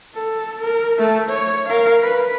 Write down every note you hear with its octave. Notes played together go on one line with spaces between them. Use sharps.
A4
A#4
A3 A4
C#5
A#4 F5
B4